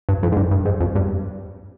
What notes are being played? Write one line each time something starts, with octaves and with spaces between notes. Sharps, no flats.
G2
F2
G#2
G2
G2
G#2
F2
G2